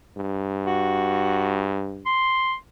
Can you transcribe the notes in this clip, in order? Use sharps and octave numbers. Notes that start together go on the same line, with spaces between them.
G2
F#4
C6